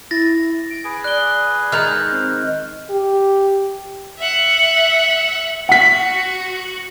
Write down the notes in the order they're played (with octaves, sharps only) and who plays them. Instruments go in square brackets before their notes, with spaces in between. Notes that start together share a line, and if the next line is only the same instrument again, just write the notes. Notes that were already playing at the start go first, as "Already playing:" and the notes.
[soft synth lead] E4 [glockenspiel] A6 A#6
[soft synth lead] D7
[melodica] G#4 B4 G#5
[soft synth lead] D5 [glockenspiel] F#6 G7
[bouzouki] D#3 G#3 A#5 [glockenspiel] F6 G6
[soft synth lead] C4
[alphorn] G4
[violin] E5 F#5
[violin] F#4 [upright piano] F#5 B6